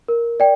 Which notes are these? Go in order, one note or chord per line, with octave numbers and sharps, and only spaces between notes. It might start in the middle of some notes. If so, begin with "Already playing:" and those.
A#4
D5 G5